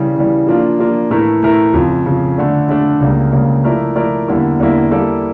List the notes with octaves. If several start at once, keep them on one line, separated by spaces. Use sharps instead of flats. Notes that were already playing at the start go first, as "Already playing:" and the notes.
Already playing: C#3 E3 G3
C#3 E3 G3
F3 A#3 D4 F4
F3 A#3 D4 F4
A2 E3 A3 E4 A#4
A2 E3 A3 E4 A#4
F2 C#3 F3
F2 C#3 F3
D3 A3 D4
D3 A3 D4
C#2 C#3 G3 A#3
C#2 C#3 G3 A#3
F3 A3 E4 A#4 D5
F3 A3 E4 A#4 D5
E2 D3 G3 A#3 E4
E2 D3 G3 A#3 E4
G3 A#3 E4 A4 D5